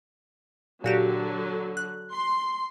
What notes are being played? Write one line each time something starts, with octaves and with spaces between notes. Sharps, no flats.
A#2 D3 F#3 F#4 G4
F#6
C6